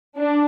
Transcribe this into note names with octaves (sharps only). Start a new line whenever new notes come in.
D4